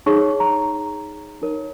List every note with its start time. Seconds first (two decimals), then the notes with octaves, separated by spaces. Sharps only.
0.06 D#4 G#4 C#5 C#6
0.40 A#5
1.42 D#4 A#4 C#5